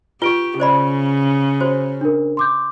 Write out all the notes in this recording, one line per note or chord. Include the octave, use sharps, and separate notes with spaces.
F4 G4 B4 C#6 D7 G7
C#3 C5 D5 B5
F#4 C5 C#5
D4 A#4
C6 D6 G6